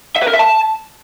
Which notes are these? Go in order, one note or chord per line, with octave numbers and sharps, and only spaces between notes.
E5
B4
A#4
E5
A5